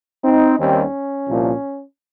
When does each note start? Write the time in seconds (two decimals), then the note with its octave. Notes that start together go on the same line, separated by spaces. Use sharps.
0.24 C4 D#4
0.58 D#2 D#3 G3 C4 C#4
1.27 C2 A#2 F3